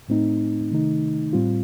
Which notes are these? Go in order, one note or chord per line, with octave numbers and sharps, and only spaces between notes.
A2 A3 C4 D#4
C3 D#3 A3 D#4
A2 G3 C4 F4